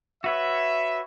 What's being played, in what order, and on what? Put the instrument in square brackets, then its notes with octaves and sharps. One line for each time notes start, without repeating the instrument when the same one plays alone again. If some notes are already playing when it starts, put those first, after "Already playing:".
[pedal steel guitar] F#4 B4 C#5 [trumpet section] E5